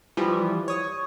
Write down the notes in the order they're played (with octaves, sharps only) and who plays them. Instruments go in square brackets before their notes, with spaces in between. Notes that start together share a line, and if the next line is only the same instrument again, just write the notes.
[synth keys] E3 F3 G3
C#5 D#6